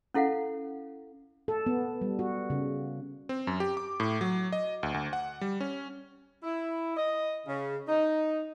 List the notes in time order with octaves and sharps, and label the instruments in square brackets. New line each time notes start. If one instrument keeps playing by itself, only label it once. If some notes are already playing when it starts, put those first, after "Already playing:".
[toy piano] C#4 E4 A4 F5 F#5
[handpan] A4
B3
G3
F#4
C#3
[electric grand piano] C4
F#2
G4
D6
A2
F#3
D#5
D2
D2
F#5
G3
C#4
[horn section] E4
D#5
C#3
D#4